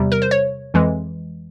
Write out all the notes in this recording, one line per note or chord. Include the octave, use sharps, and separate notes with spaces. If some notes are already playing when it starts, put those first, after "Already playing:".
Already playing: E2 C3 G3
A#4
C5
C#5
F2 E3 G#3